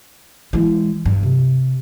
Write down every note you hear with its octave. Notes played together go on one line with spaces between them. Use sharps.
E3 G#3
G2
C3